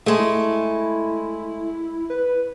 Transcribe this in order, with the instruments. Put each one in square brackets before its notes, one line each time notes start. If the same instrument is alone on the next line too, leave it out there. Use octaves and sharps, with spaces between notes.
[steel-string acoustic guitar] G#3 A3 [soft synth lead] G#4
[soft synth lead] E4
B4